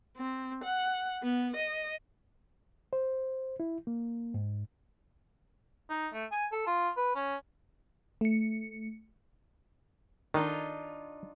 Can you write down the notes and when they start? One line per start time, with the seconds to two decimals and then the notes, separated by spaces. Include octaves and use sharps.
0.17 C4
0.64 F#5
1.23 B3
1.56 D#5
2.93 C5
3.60 E4
3.87 A#3
4.34 G#2
5.90 D#4
6.13 A3
6.32 G#5
6.52 A4
6.67 F4
6.97 B4
7.16 C#4
8.21 A3 C#7
10.34 D#3 D4 D#4 F4